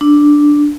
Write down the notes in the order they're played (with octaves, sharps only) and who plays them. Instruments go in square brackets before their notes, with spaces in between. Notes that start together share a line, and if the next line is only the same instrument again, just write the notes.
[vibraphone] D4